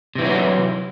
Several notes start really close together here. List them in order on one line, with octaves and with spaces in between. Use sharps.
C3 E3 G#3 F#3